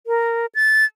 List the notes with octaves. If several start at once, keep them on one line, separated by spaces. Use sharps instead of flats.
A#4
A6